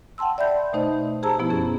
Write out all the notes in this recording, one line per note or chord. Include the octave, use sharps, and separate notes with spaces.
F#5 G5 A5 C6 E6
D5 E5 B5 G6
B2 A3 D#4 C5 D#5
G4 G#4 C5 A5 A#5 E6
B2 F3 B3 E4
F#2 C#4 G#4